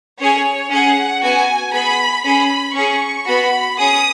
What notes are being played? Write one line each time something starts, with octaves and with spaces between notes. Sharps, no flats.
C#4 G#4 C#5
C#4 G#4 F#5
B3 F#4 G#5
B3 G#4 B5
C#4 G#4 B5
C#4 G#4 C#6
B3 F#4 B5
C#4 G#4 D#6